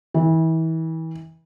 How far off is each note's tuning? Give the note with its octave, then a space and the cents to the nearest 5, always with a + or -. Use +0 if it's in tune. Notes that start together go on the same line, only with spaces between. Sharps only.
E3 -30